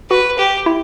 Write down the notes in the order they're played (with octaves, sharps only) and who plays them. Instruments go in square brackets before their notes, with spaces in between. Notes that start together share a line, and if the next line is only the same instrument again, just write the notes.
[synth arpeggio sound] F#4 [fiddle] B4
[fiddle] G4
[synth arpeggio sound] E4